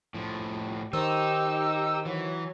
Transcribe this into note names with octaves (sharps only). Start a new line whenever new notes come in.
A2 F3
D#3 D#4 G4 C5 D#5 E6
E3 F#3